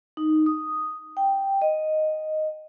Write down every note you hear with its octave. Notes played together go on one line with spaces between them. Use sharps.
D#4
D#6
G5
D#5